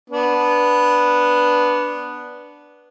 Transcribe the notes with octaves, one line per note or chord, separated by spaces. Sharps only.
B3 D4